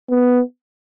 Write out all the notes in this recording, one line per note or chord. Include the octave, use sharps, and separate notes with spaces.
B3